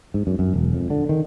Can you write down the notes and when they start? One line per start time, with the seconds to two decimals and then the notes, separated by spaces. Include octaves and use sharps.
0.14 G#2
0.27 F#2
0.39 F#2
0.54 E1
0.73 F2
0.90 D3
1.09 D#3